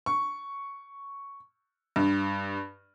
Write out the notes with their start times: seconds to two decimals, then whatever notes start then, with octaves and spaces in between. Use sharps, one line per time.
0.06 C#6
1.96 G2